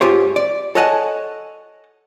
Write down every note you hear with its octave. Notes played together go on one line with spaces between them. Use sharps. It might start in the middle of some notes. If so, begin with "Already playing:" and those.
G#2 F4 G4 C5 C#5
D5
A4 C#5 D#5 F#5 G#5 A5